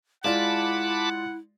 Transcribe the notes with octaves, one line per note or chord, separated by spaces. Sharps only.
G#3 E4 F4 D5 F#5 A5 B5 D6